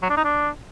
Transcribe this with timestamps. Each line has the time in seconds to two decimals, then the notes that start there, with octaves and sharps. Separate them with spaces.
0.02 F#3
0.10 D4
0.17 D#4
0.24 D4